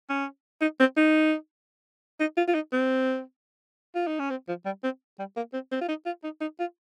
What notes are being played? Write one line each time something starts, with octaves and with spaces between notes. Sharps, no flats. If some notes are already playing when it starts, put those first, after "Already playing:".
C#4
D#4
C4
D#4
D#4
F4
F4
D#4
C4
F4
D#4
C#4
C4
F3
G3
C4
G3
A#3
C4
C4
F4
D#4
F4
D#4
D#4
F4